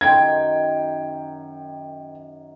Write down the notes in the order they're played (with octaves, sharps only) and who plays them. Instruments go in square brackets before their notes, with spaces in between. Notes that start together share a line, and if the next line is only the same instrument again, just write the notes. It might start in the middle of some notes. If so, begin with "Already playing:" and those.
[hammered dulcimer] F#2 D#3 C6 [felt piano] G5 G#6